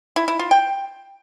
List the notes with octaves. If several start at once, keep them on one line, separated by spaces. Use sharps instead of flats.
E4
E4
F4
G5